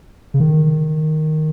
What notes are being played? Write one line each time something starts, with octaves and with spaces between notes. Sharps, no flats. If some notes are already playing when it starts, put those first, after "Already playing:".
C#3
D#3